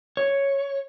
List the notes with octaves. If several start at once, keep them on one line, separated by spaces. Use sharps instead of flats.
C#5